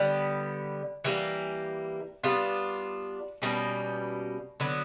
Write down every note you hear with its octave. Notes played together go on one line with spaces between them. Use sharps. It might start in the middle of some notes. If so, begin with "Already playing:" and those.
Already playing: D3 G3 B3
E3 G3 A#3
G3 B3 D4 F4
B2 G3 A#3 C#4
D3 F#3 B3